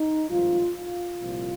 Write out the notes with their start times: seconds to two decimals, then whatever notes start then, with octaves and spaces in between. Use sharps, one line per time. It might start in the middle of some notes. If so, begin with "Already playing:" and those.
Already playing: D#4
0.29 G#1 G2 F3 F4
0.75 F4
1.19 C2 A#2 F3